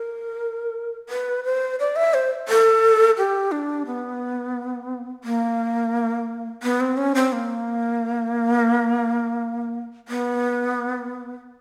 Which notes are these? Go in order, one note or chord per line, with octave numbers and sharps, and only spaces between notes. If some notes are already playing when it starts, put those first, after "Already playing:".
Already playing: A#4
B4
C5
D5
E5
C5
A4
G4
D4
B3
A#3
B3
C4
C#4
C4
A#3
B3